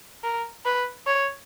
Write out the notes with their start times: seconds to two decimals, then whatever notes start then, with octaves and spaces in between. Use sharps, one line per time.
0.24 A#4
0.65 B4
1.06 C#5